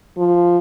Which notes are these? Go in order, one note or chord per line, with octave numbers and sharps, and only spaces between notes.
F3